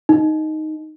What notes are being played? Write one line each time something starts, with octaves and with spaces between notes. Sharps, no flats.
D#4